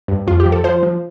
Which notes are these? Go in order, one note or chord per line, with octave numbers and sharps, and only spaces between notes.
G2
F2 F4
G4
F3
A4
F3 C5
F3